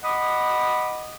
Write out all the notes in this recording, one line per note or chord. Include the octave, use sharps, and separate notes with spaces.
D#5 F#5 B5 D6 D#6